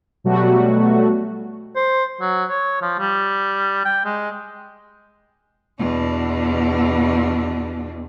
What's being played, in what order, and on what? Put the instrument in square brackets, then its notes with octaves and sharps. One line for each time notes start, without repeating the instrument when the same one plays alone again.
[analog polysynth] B2 F#3 G3 A3 F#4
[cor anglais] C5
F#3
C#5
F3
G3
G5
G#3
[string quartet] E2 B2 D4